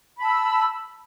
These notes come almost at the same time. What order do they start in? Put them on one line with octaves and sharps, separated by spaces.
B5 A5 E6